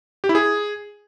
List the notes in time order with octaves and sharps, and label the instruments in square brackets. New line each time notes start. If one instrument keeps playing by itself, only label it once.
[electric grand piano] G4
E4
G#4